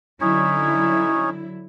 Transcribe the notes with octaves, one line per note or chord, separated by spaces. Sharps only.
D3 F#3 C#4 D#4 E4 C#5